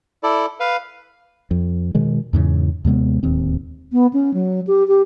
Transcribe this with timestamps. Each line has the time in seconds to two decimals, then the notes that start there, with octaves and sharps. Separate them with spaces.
0.23 E4 A4 D5
0.60 B4 F5
1.51 F2
1.95 B2 D#3 G#3
2.33 E2 G#2 C#3 E3
2.85 D#2 C3 G#3 B3
3.23 D1 D#2 C4
3.92 B3
4.13 C#4
4.34 F#3
4.67 G4
4.88 G4